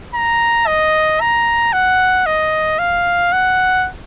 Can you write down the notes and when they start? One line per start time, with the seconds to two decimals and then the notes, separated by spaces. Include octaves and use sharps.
0.14 A#5
0.67 D#5
1.21 A#5
1.73 F#5
2.26 D#5
2.79 F5
3.32 F#5